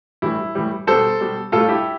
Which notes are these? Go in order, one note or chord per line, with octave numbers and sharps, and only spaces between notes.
A2 E3 G3 E4
A2 E3 G3
B2 G3 A4 C5
B2 G3
A2 G3 F4 A4
E4 G4